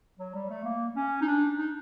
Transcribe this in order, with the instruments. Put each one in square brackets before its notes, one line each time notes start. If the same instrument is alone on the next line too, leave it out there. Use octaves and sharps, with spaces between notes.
[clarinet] F#3
G3
A3
A#3
C#4
D#4
D4
D#4